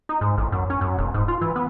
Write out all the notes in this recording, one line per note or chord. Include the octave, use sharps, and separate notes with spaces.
D#4
G#2
A1
F#2
C#4
F#2
E1
G#2
F4
E3
B3